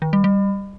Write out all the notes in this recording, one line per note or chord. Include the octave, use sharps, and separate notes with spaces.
D#3
G3
G3